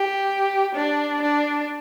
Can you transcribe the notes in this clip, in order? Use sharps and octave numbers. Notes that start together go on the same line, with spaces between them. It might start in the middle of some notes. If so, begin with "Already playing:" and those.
Already playing: G4
D4
D4